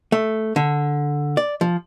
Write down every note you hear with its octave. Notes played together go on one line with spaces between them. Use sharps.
A3
D3
D5
F3